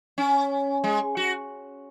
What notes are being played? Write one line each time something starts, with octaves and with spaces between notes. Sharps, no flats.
C#4
G#3
F#4